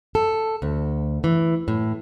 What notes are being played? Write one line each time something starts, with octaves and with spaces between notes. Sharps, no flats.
A4
D2
E3
A2